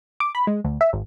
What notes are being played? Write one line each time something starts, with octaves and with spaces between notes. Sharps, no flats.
D6
B5
G#3
D2
E5
G#1